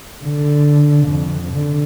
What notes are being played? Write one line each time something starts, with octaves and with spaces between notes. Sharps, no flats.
D3
F2
D3